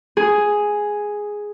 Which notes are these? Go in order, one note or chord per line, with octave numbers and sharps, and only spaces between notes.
G#4